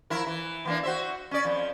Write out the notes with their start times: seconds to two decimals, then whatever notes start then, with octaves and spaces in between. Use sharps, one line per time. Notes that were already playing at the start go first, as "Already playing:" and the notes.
0.10 F3 E4 A#4
0.27 E3
0.65 E3 A#3 D4
0.83 F#4 C5 E5
1.31 C#4 D5
1.45 F2 F3